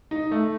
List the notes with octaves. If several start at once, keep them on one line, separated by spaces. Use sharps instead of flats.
D#4
A3